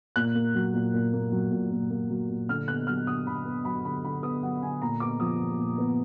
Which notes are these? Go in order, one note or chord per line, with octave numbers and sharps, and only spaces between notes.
A#2 F#6
A#3
F#3
A#2
A#2
A#3
F#3
A#2
A#2
A#3
F#3
A#2
D3 F6
B3 F#6
F#3 F6
D3 D#6
D3 B5
B3
F#3 B5
D3 B5
D3 B5
B3 D#6
F#3 F#5
D3 G#5
A#2 A#5
B3 D6
F3 D#6
A#2
A#2
B3